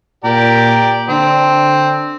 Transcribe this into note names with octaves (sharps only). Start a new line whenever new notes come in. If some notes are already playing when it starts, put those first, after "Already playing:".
A#2 G4 A#4 D5
D3 C4 D4